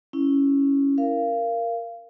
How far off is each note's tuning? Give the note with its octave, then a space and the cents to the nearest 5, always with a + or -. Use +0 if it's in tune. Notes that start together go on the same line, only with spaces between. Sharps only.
C#4 +0 E4 -5
A#4 +0 F5 -20